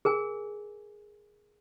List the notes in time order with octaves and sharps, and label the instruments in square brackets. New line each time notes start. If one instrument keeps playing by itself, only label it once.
[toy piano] G#4 A#4 G#5